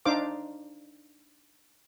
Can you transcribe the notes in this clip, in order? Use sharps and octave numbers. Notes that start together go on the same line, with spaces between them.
D4 D#4 C5 F5 D6